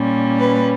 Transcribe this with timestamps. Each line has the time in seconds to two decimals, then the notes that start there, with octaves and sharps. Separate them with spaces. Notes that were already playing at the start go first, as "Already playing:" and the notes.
Already playing: A#2 G3 C#4
0.38 B4